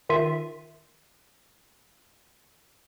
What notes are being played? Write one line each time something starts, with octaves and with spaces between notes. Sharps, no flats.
D#3 F4 E5 D#7